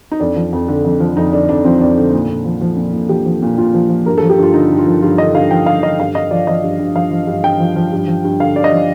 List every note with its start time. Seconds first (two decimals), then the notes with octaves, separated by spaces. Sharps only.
0.12 D#4
0.20 F2 D4
0.36 F3
0.53 F2
0.68 D3
0.84 F2
1.00 F3
1.17 F2 D#4
1.33 D3 D4
1.49 F2 D4
1.64 F3 C4
1.80 F2 D4
1.97 D3
2.13 A#2
2.29 A#2
2.45 F3
2.61 F3
2.77 A#2
2.93 A#2
3.09 F3 G4
3.26 F3
3.42 A#2
3.58 A#2 F4
3.74 F3
3.89 F3
4.06 G2 A#4
4.18 F3 A4
4.30 G4
4.38 G2 F4
4.54 D3 D#4
4.70 G2
4.78 F4
4.87 F3
5.02 G2 F4
5.18 D3 D#5
5.35 G2 F5
5.51 F3 G5
5.66 G2 F5
5.83 D3 D#5
5.99 G2 F5
6.15 G2 D#5
6.31 F3 D5
6.47 F3 D#5
6.63 G2
6.79 G2
6.95 F3 F5
7.11 F3
7.27 G2
7.43 G2 G5
7.60 F3
7.76 F3
7.92 G2
8.08 F3
8.24 G2
8.40 D3 F5
8.56 G2 D5
8.64 D#5
8.73 F3